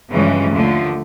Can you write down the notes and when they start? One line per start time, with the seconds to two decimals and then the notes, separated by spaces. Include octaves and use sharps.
0.12 G2 C#3 E3 F3 G#3 C#4
0.50 D#2 D3 F3 A3